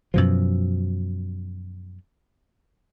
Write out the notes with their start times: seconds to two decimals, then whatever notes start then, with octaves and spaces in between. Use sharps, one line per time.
0.14 F#2 B2 F3